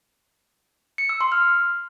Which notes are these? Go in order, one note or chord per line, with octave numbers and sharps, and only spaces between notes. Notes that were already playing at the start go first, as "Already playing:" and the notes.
C#7
E6
C6
F6